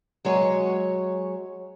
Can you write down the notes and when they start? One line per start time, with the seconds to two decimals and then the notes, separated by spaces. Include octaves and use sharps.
0.25 F#3 G#3 C#5